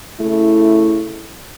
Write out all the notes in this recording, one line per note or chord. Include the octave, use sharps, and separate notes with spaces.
C#3 A3 E4